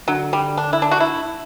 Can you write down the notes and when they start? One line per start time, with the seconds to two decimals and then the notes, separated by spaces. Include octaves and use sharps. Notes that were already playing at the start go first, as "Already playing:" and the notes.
0.08 D3 F#3
0.33 G3
0.57 D4
0.73 E4
0.82 D4
0.91 F#4
1.00 E4